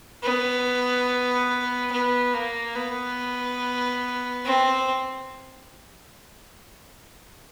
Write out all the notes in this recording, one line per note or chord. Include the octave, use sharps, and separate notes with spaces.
B3
B3
A#3
B3
C4